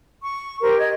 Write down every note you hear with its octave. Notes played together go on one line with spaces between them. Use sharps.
C#6
G4 A#4 C5
D#5 G#6